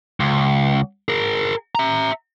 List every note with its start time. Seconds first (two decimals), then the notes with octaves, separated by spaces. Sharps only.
0.20 C#2
1.09 G#4 A#4
1.75 E5 A#5